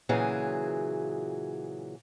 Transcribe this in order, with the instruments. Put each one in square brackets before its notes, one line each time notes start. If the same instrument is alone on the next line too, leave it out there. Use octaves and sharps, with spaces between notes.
[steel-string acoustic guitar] A#2 C#3 E3 F#3 G#4